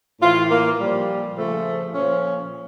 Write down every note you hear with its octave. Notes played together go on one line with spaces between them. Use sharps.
A2 E3 F4
A#3
A#2 F3 G3
C#3 F3 A3
A#2 F3 C#4